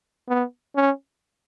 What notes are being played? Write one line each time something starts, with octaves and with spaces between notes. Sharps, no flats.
B3
C#4